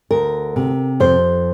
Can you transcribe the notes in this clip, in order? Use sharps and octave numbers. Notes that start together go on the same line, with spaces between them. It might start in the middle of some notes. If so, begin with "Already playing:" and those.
D2 A#4
C3
F2 C5